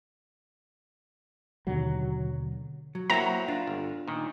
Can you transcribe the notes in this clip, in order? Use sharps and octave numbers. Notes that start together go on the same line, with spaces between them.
D#2 B2 D3 F#3
F#3
F#3 A#3 C4 E4 F#4 A#5
D4 F4
G1
A#2 D#3